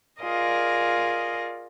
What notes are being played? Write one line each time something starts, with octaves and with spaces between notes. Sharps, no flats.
F4 G#4 A#4 D5 D#5